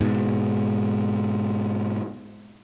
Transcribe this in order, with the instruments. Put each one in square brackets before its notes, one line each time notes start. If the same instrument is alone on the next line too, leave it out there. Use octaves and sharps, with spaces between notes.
[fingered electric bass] G#2 B2